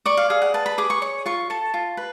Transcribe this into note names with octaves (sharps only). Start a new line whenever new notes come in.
D5 C#6
F5
G#4 F5
F#5
B4 A5
B5
G#4 D6
C#6
C#5 C#6
F4 C#6
A4 A5
F4
B4